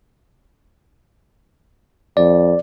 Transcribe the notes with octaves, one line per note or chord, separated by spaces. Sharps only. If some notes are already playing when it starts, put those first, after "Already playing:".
F2 D5